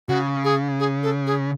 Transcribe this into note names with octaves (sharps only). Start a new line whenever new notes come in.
C#3 F#4
G#4
G#4
A4
G#4